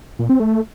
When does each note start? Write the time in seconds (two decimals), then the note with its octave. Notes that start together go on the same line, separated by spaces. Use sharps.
0.19 A#2
0.29 C4
0.40 A3